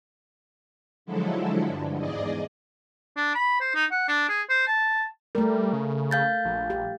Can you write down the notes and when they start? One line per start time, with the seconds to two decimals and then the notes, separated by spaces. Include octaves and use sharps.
1.05 D3 F3 F#3 G#3 E4 A4
1.66 G2 D3
1.97 E2 G#2 G#4 D5 D#5
3.16 D4
3.35 B5
3.60 C5
3.75 D#4
3.91 F#5
4.08 D4
4.29 G#4
4.49 C5
4.67 A5
5.35 G3 A3 A#4
5.73 C#3
6.11 F5 G6 A6
6.45 A#1
6.70 G4